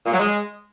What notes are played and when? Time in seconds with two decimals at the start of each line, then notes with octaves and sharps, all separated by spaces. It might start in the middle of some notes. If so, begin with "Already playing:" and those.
0.06 A#2
0.13 F#3
0.20 G#3